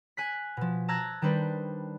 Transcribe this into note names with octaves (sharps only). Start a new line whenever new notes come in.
G#5 F#6 B6
B2 F3
A5 A#5 E6 F#6 G#6 A#6
D#3 G3 D4 B4 C5